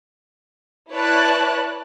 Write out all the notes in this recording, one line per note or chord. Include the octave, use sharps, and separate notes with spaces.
E4 B4 C#5 D5 A5 F#6